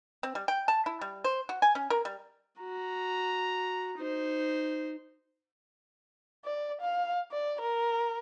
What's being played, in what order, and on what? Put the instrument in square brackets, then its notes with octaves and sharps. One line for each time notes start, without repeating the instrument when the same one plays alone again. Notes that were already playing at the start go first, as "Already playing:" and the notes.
[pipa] C4
G3
G5
A5
E4
G3
C5
F#4
G#5
C#4
A#4
G3
[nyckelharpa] F#4 [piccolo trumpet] A#5
[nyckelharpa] D#4 C5
[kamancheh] D5
F5
D5
A#4